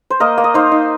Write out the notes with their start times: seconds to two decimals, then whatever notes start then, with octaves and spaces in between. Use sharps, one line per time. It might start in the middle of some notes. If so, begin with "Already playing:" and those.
0.10 C5
0.20 A#3 A#4 D#5
0.38 A#3
0.44 D#5
0.54 D#4 C5 F5
0.72 D#4